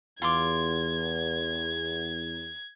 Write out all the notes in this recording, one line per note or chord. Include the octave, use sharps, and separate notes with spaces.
E2 F4 C6 D6 G#6